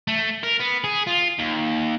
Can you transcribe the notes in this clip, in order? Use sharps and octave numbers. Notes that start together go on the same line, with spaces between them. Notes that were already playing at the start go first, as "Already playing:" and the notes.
A3
A#4
B3
G#4
F4
D#2